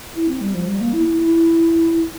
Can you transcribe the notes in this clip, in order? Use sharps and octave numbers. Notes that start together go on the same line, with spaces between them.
E4
C4
G3
F3
G3
A#3
E4
E4
E4